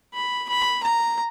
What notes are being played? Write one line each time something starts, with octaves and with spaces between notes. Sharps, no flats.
B5
B5
A#5